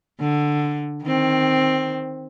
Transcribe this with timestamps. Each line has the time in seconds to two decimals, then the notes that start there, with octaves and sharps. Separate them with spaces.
0.20 D3
1.03 D#3 C4